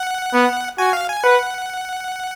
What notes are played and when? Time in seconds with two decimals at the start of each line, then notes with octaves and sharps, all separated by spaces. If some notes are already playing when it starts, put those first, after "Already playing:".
Already playing: F#5
0.33 B3
0.78 F#4 G#5
0.93 F5
1.09 G#5
1.24 B4 F#5